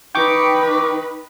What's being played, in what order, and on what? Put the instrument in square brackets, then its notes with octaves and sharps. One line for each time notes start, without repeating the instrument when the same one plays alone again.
[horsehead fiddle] D#4 B4 [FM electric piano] G5 C#6 D6